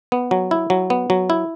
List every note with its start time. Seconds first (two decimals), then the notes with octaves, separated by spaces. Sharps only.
0.12 B3
0.31 F#3
0.51 E4
0.70 F#3
0.90 B3
1.10 F#3
1.30 E4